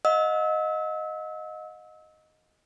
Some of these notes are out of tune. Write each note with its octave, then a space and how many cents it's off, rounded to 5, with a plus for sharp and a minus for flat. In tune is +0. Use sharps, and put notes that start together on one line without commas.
D#5 +0 F#5 -45 E6 -35